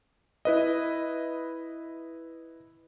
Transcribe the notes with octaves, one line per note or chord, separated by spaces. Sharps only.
E4 B4 D#5